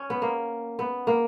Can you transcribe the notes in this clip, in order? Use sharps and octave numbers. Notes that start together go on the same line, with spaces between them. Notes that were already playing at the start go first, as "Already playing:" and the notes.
Already playing: C#4
B3
A#3
B3
A#3